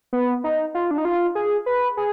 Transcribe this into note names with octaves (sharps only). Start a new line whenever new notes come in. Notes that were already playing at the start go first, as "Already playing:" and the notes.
B3
D#4
F4
D4
D#4
F4
G#4
B4
G#4